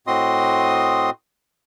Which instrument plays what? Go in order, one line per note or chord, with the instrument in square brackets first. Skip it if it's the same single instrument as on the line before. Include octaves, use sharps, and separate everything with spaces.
[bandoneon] A2 C4 F#4 D#5 C6 D#6